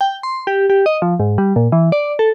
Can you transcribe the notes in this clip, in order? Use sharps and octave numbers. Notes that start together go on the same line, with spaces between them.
G5
C6
G4
G4
D#5
F3
G#2
G3
A#2
E3
D5
A4